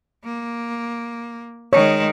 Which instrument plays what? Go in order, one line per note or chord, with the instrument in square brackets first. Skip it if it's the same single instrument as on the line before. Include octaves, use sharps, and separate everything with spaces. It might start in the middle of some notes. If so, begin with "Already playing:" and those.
[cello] A#3
[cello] D#3 G#3 [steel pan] C#5